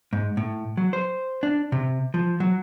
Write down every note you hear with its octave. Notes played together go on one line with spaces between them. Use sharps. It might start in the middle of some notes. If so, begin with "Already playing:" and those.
G#2
A2
F#3
C5
D4
C3
F3
F#3